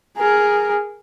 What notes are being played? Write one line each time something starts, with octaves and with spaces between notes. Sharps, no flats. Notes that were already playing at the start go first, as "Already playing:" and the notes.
G#4 A#4